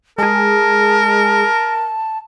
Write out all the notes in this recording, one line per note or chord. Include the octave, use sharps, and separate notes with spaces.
G#3 G#4 A#4 A5